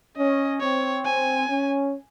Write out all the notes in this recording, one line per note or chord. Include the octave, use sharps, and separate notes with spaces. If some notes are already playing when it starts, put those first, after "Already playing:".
C#4 D#5
C4 C#5
G#5
C#4